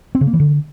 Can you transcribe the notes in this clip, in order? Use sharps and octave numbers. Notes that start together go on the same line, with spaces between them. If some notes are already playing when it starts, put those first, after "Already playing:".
C4
C#3
A#3
E3
D3